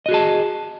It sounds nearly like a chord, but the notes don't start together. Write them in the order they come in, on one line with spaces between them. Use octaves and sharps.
D#5 F#4 G#4 A5